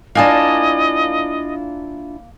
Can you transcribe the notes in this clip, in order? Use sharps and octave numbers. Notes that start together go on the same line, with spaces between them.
A#3 D4 E4 F4 D#5 G#5 A5